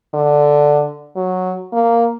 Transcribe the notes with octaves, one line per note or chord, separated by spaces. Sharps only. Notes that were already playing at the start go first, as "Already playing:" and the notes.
D3
F#3
A#3